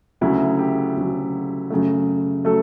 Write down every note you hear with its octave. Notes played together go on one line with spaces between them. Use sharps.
D2 C#3 F#3 E4
G4
D2 C#3 F#3
F#2 C#3 F#3 A3
F#3 A3 A4